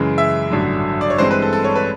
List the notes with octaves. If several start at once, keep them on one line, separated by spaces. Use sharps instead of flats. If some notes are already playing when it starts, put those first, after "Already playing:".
Already playing: F#2 C#3 E3 G#3
E5
A1 G2 D3 F#3
D5
C#5
G2 E3 G#3 C4 C5
B4
A4
A4
C#5
B4